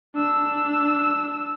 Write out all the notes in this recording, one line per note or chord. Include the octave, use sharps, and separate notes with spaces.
D4 E6